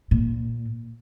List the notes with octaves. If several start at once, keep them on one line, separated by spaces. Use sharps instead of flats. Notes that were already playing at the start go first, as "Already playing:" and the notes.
A#2